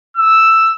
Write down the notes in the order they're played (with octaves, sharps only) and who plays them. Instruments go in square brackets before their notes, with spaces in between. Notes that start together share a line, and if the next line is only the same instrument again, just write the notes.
[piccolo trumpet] E6